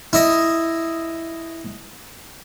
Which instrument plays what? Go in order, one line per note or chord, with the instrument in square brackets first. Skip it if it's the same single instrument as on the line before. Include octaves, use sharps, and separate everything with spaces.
[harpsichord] E4 D#5